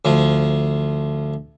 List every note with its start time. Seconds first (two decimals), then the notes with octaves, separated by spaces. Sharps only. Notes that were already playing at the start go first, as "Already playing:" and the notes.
0.05 D2 F3